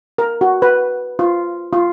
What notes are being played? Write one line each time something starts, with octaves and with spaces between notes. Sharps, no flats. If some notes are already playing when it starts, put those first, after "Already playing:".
A#4
F#4
B4
F4
F4